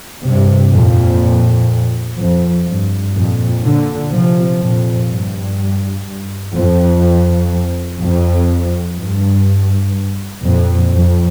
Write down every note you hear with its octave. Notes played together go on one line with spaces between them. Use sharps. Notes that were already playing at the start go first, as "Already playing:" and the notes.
G2 C3
F2 A#2
F2
G2
F2 A#2
A#2 D3
C3 F3
F2 A#2
G2
F2
F2
G2
F2 A#2
F2